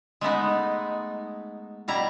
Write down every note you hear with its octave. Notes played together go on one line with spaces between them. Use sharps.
G#3 A3 B3 D#4
B2 G3 E4 A#5